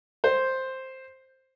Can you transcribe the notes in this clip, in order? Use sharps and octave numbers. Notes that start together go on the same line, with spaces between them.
C5